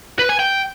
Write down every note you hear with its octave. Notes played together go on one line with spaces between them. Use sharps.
B4
G#5
G5